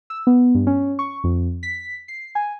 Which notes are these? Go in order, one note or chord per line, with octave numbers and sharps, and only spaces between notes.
E6
B3
G2
C#4
C#6
F2
B6
C7
G#5